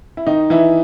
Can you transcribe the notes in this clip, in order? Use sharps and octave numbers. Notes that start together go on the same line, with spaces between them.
E4
D#3 D#4
E3 E4